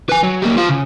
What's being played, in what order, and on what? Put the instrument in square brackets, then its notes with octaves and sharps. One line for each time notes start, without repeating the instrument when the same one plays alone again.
[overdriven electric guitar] B4 G#5
F#3
G3 A#3
F4 C5
C#3